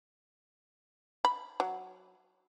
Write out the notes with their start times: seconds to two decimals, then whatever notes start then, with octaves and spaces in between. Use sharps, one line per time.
1.25 B5
1.60 F#3